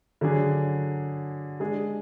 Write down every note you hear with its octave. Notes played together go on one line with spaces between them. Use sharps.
D3 F#3 D4 G#4
G#3 D4 G#4